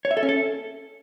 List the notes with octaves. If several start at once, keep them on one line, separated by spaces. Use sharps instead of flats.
C#5
E5
A4
C#4
A4